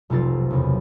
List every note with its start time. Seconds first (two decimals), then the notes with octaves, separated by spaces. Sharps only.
0.10 F1 B1 C3 F4 A6
0.50 F#1 E2